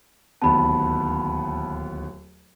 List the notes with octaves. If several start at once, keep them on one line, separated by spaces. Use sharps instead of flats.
D1 D#2 B3 A5 B5